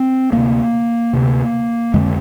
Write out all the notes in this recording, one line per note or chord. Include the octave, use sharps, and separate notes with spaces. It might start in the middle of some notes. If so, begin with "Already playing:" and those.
Already playing: C4
D2 C3 A#3
D2 C3
F2 D3 G#3